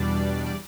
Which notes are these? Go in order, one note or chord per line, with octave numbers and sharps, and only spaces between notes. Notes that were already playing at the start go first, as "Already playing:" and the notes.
Already playing: E2 B2 G3 D4 D5
D5